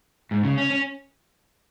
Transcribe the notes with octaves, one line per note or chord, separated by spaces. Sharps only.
G#2
C#3
C#4
C#4